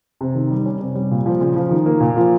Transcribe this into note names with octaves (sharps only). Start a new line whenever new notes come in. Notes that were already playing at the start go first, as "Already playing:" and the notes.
C3
D#3
G3
C#4
C3
G3
A#2
F3
C#3
F3
D#3
A#3
A#2
F3